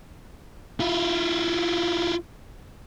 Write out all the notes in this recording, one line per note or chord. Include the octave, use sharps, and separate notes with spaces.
E4 F4